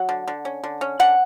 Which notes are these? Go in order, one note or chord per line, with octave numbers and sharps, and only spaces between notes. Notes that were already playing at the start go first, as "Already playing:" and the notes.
Already playing: F#3 F#5
D3
D3
C#4
D3
C#4
D3 F#5